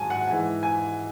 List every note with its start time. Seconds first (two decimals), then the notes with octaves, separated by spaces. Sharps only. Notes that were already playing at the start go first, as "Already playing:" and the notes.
Already playing: G#2 F#3 G#5 A5
0.10 F#5
0.28 G#2 E3 G#5
0.63 G#5